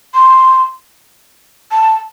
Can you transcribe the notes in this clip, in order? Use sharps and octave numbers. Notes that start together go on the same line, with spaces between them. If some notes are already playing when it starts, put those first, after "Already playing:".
C6
A5